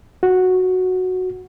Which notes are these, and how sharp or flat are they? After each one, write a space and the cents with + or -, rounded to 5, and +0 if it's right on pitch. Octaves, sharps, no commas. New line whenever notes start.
F#4 -5